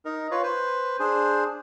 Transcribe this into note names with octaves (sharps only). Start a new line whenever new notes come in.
D#4 A#4
F4 B4 C#5
B4 C5
D4 G#4 C5